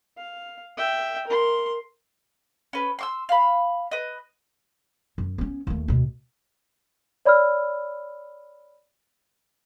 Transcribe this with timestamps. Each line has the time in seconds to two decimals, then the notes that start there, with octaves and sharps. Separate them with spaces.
0.18 F5
0.77 E5 G5
1.27 A#4 C6
2.73 C#4 B4
2.99 C6 D6 E6
3.29 F5 B5
3.91 B4 D#5
5.18 F#2
5.38 B3 C#4
5.67 D#2 A3
5.88 D2 B2
7.25 C#5 D5 B5 E6 F6